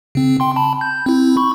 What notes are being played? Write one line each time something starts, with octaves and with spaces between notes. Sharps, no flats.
C#3 C4
G5 C6
A5 B5
G6
C4 E4
B5 C#6